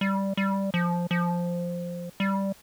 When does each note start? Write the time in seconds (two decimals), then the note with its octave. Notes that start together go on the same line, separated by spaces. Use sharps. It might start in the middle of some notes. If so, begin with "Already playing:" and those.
0.01 G3
0.37 G3
0.74 F3
1.11 F3
2.20 G3